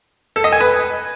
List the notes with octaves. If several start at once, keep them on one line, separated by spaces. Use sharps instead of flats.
A4
D#5
G#5
B4